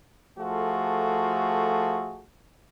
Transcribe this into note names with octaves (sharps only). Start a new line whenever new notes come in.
F3 A3 F4 F#4 G#4 A4